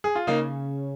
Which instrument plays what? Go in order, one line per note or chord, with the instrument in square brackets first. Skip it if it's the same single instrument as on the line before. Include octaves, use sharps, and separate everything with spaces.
[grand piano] G#4
F4
[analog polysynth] C#3 [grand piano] A#3 D#4